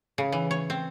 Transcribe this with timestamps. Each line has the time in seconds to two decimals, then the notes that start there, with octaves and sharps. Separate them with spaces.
0.18 C#3
0.32 E3
0.51 C#5
0.70 C4